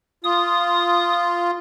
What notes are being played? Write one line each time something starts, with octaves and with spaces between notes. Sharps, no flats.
F4 D#6